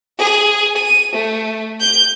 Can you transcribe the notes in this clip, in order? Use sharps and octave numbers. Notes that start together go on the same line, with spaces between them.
G#4
D#7
A3
G6